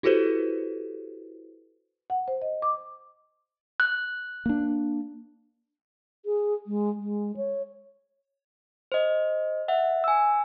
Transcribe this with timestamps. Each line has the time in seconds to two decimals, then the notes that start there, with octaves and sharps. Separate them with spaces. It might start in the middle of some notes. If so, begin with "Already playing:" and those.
0.03 E4 F#4 G4 A4 B4 C5
2.10 F#5
2.28 C5
2.42 D#5
2.62 D6
3.80 F#6
4.46 A#3 D4
6.25 G#4
6.67 G#3
7.00 G#3
7.37 C#5
8.92 C5 D#5
9.68 E5 F#5
10.04 G#5 E6